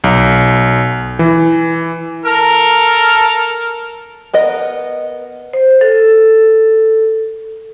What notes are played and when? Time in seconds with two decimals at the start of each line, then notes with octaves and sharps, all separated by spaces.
0.04 B1
1.19 E3
2.25 A4 A#4 F6
4.34 B3 A#4 D#5
5.53 C5
5.81 A4